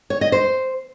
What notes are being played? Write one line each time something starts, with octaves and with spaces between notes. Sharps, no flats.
C#5
D#5
C5